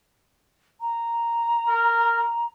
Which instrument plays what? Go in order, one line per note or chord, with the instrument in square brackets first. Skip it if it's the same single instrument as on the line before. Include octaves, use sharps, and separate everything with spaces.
[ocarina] A#5
[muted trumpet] A#4